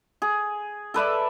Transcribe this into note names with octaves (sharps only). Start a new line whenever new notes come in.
G#4
A4 B4 D5 E5